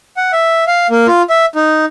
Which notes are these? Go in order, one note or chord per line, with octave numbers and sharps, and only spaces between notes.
F#5
E5
F5
A#3
F4
E5
D#4